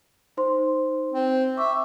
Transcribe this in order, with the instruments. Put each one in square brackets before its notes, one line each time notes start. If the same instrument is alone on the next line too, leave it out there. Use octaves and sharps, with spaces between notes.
[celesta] D#4 C5 C6
[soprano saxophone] C4
[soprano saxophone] E5 [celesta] C#6 D6 E6